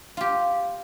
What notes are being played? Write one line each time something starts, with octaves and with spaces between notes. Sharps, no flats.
F4 G4